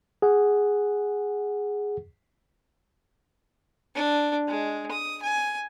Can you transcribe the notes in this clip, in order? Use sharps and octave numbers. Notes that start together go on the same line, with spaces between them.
G#4 F#5
D4
G#3
D#6
G#5